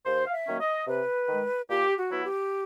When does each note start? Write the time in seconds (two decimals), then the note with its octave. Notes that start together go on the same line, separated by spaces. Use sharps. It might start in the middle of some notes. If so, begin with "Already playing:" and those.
0.06 D#2 C5
0.26 F5
0.33 E5
0.47 D#3 F#3 A#3 C#4
0.60 D#5
0.87 C3 B4
1.29 D#3 G#3
1.70 A#2 G4
1.97 F#4
2.11 F#3 B3 E4
2.25 G4